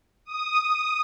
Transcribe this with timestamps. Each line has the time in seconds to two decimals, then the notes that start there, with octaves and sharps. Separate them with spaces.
0.25 D#6